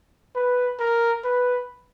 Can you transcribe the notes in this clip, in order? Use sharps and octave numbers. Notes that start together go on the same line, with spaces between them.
B4
A#4
B4